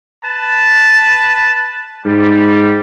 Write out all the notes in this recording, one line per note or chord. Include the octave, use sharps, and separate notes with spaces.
B4 A5
G#2 G3